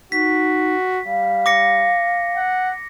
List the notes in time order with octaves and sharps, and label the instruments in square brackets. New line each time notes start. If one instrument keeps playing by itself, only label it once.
[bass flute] D#4 [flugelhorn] F#4 [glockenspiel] B6
[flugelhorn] G3 [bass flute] F5
[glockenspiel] D6 A#6 C#7
[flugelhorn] F#5